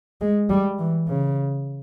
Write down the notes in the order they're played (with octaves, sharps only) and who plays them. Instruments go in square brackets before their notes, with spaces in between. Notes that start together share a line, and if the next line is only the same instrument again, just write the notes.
[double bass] G#3
G3
E3
C#3